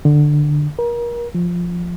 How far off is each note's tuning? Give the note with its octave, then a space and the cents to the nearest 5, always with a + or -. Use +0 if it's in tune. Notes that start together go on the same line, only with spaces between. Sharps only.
D3 +10
A#4 +30
F3 +0